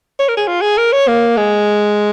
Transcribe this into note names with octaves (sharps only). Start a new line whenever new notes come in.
C#5
A#4
G#4
F4
G#4
A#4
C#5
A#3
G#3